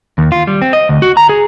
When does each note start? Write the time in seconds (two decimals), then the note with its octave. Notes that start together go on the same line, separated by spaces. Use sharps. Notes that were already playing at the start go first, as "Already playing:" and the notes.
0.18 D#2
0.32 F4
0.47 G3
0.62 C4
0.73 D#5
0.89 D2
1.02 F#4
1.17 A#5
1.29 G#4